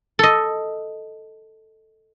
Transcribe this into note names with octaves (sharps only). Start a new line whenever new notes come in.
A4 D#5